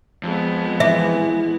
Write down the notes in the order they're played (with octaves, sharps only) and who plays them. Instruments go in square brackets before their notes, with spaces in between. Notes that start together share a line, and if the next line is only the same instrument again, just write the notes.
[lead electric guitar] F2 [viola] G#3 B3
[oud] E3 B4 [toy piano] E5